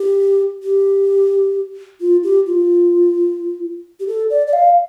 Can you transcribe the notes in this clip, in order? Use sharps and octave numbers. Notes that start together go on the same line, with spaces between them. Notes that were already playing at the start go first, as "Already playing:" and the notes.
Already playing: G4
G4
F4
G4
F4
G4
A4
D5
D5
F5